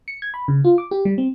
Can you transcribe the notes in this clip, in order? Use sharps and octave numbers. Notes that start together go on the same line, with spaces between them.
C#7
G#6
B5
C#3
F4
D6
G4
G3
C4